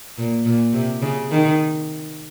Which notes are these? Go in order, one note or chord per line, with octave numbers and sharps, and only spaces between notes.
A#2
A#2
C3
C#3
D#3